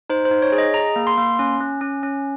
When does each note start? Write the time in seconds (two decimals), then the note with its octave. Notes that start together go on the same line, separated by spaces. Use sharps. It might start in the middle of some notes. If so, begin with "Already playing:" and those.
0.09 D#4 C5
0.25 C5
0.31 D#4
0.42 C#5
0.52 G#4
0.58 D#5
0.74 G#4 A#5
0.96 A#3
1.07 C6
1.18 A#3
1.39 C#4
1.61 C#4
1.81 C#4
2.03 C#4